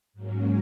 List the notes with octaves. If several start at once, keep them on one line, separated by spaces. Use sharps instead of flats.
G#2 F#3 A#3 C#4